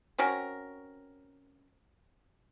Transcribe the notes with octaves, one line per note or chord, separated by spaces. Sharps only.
C4 C#4 F#4 A#4